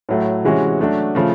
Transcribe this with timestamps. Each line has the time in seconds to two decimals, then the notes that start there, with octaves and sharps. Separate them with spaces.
0.09 A2 F#3 A3
0.44 C3 E3 G#3 C#4 F#4
0.80 F#3 A3 D4 F#4
1.15 C#3 F3 A3